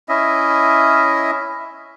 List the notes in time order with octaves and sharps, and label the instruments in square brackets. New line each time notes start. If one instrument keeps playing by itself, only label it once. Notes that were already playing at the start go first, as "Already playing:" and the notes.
[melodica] C#4 E4 D#5 E5